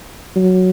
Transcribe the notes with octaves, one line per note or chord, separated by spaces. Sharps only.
F#3